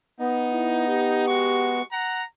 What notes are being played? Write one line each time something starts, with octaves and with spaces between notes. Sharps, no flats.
B3 D#4
E4
G4
G#3 F#4 C#6
F#5 A#5